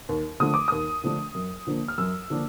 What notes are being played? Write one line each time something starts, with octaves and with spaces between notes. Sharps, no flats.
D#2
D3 F3 A3 D4 D#6
D6
D#2 D#6
D3 F3 A3 D4
F#2
D3 F3 A#3 D4
F6
F#2 E6
D3 F3 A#3 D4